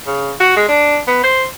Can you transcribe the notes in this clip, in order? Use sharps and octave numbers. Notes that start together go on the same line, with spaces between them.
C#3
F#4
G#3
D4
B3
C5